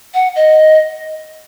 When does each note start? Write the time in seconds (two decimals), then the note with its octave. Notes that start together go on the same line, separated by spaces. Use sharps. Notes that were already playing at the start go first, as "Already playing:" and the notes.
0.14 F#5
0.36 D#5